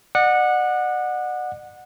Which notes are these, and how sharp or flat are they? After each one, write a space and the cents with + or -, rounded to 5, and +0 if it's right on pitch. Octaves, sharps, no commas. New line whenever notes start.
D5 +45 F#5 -15 D6 +45